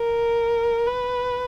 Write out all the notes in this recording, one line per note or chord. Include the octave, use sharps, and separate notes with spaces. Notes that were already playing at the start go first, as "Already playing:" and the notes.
Already playing: A#4
B4